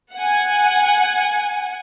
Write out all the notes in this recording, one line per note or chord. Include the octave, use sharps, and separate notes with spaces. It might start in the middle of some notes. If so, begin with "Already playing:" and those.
F#5 G#5